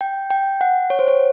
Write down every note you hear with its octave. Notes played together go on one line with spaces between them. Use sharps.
G5
G5
F#5
C#5
C5
C#5